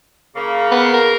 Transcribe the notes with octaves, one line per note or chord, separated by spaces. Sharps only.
C#3 A#3
B3
A#4